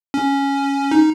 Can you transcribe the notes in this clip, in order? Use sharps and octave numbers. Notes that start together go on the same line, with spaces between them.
C#4
D#4